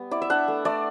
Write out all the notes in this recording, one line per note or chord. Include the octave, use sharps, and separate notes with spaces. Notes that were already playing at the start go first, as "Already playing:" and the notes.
Already playing: G3 B3
E4 D5
E5
D4 F#5
A3
A3 D5